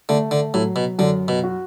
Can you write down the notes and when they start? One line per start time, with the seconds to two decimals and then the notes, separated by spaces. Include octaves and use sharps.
0.09 D3 A3
0.31 D3
0.54 A2 F#3
0.76 B2
0.99 F#2 D3
1.28 B2
1.43 F#4